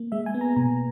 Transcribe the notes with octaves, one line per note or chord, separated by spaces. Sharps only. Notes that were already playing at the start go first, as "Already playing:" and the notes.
Already playing: A#3
G#3 E5
G#5
B3
A#5
B2 A#5